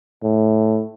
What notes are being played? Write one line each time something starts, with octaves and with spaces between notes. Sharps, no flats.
A2